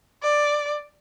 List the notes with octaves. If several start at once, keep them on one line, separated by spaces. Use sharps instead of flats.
D5